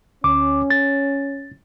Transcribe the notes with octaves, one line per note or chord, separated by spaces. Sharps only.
D2 C#4 D6
A6